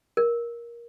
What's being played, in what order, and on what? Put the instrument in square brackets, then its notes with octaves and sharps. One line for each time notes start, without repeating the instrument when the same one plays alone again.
[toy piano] A#4